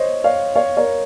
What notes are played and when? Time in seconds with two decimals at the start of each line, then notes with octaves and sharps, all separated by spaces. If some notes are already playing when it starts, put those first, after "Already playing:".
Already playing: C5 C#5 D#5
0.24 C#5 F5
0.55 C#5 F5
0.77 A#4 C#5